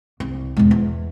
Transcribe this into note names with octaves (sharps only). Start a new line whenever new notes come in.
C2
E1 G#2
E2